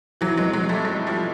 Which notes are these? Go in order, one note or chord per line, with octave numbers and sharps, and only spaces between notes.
E3 F#3
F#3 G#3
F#3 G#3
G3 A3
F#3 G#3
F3 G3